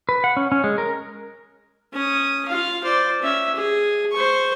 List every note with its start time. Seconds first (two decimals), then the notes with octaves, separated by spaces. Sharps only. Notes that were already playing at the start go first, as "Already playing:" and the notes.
0.09 B4
0.24 F#5
0.37 C#4
0.52 C#4
0.64 G#3
0.78 A#4
1.93 C#4 D#6
2.48 F4 F5
2.83 C5 D5
3.22 C#4 E5
3.55 G#4
4.12 C5 C#6